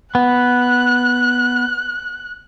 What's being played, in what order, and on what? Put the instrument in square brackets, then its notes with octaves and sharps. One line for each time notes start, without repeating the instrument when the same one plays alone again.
[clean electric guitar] B3 [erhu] F#6